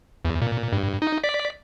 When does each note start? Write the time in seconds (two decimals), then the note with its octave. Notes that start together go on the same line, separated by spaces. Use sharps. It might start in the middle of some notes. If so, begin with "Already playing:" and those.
0.25 E2
0.42 A#2
0.72 G2
1.02 D#4
1.23 D5 B6